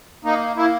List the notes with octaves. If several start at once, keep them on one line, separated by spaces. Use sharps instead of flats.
A#3 D#4
A#3 E4